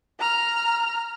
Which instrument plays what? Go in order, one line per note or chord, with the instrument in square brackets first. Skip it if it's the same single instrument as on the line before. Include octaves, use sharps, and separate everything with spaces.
[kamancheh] A#5 F6